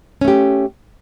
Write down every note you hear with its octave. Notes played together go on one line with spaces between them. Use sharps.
A3 C#4 G4